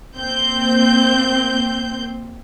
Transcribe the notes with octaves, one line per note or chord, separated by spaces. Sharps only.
A#3 C4 G6